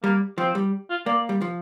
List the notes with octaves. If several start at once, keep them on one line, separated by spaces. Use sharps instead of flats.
G3 A#3
F3 C4
G3
F4
A#3 D5
G3
F3